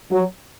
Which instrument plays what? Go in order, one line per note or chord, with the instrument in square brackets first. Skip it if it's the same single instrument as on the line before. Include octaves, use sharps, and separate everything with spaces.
[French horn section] F#3